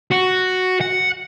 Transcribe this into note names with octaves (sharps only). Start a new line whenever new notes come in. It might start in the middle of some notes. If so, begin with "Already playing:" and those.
F#4
F#5